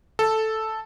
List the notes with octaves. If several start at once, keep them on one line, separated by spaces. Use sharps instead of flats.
A4